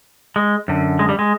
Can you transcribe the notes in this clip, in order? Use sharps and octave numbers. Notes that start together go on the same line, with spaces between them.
G#3
F#2 D3
G#3
G3
G#3